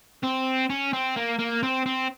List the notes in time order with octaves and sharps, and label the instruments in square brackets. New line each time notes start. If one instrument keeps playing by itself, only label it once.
[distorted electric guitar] C4
C#4
C4
A#3
A#3
C4
C4